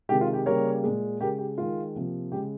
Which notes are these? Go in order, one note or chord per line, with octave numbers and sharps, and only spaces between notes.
C3 D#3 G#3 G4
F4
G4
C#3 G3 A#3 A#4 C#5
A#2 G#3
C#3 G#3 G4 A#4
G4
D#3 G#3 F4
C3 F3 A#3
C#3 G#3 G4